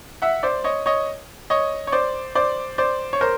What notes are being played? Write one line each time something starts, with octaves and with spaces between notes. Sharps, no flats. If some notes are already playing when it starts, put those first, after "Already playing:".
E5 F#5
C5 D5
C#5 D#5
C#5 D#5
C#5 D#5
C#5
C5 D5
C5 D5
C5 D5
C#5
A#4 C5